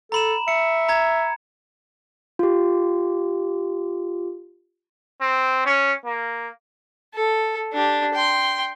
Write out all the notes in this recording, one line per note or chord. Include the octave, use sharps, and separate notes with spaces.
A4 A#5 B5 E7
E5 C#7
A#5 G#6
F4 G4
C4
C#4
A#3
A4
D4 G4
G5 C6